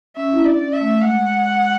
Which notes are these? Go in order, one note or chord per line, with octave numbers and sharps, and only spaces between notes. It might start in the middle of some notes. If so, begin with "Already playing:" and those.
C#4 E5
E4
D4
D5
C#4
E5
A3
G#3 F#5